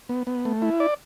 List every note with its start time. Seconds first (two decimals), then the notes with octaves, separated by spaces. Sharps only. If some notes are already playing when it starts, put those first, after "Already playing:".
0.09 B3
0.27 B3
0.45 A3
0.62 E4
0.80 D5